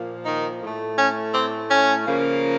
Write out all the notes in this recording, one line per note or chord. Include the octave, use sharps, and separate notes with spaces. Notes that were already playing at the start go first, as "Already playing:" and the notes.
Already playing: A#2 F3 A#3
D#3 D#4
A2 A3
C#4
C4
C#4
C#3 F3 A#3